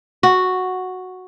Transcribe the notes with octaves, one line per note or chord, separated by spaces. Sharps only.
F#4